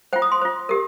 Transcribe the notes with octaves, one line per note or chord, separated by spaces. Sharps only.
F4 C5 G5
D#6
C6
F4 C5
G4 A#4